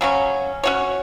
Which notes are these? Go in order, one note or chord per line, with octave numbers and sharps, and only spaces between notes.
C#3 F#3 C#4
C#4 F#4 C#5